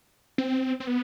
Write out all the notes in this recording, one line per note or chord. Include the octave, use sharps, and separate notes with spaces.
C4
C4
B3